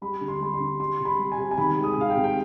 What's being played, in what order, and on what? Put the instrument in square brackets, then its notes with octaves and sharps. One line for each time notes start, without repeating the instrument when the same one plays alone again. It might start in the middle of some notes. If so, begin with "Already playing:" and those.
[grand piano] G3 B5
D3
C6
G3 B5
C6
D3
G3 C6
C3
B5
G3
G#5
C3
G#5
D#3 B5
G#3
D#6
C3 F5
G5
C3
G5